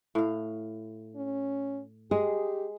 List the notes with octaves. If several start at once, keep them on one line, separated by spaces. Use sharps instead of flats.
A2 F5
C#4
G#3 G4 G#4